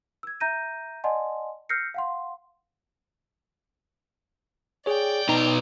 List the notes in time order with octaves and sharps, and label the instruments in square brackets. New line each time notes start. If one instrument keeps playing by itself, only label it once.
[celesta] E6 G#6
E5 A#5 G6 A#6 D#7
D5 D#5 F#5 G#5 A5 C6
E6 F6 G6 A#6 C7 C#7
F5 F#5 C6
[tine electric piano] G#4 C#5 [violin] D5 G5
[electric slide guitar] B2 A#5 [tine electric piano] D#4